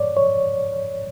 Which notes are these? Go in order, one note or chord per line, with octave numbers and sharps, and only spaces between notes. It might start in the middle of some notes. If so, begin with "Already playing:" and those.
Already playing: C#5 D5
C#5